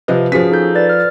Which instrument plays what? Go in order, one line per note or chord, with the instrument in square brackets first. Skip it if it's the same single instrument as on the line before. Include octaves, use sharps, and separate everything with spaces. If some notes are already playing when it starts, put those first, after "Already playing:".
[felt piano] C3 F3 D#5 [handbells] B4
[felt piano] F3 B6 [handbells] C#4 F#4 G#4
[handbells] D#4 A4 G6
B4 D5 A6
F6 A6